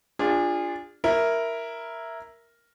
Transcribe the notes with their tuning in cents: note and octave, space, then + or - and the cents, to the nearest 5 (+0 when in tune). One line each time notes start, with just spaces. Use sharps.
D4 +0 F4 +0 G#4 -30
E4 +0 A#4 +0